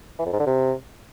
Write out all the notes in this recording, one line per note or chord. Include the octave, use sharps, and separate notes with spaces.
E3
F2
G#2
D3
C3